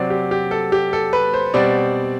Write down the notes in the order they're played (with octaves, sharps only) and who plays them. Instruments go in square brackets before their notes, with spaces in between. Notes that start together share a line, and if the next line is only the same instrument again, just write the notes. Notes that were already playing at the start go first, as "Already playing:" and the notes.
Already playing: [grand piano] C3 F#3 C4 D5
G4
G4
A4
G4
A4
B4
C5
B2 G3 C4 D5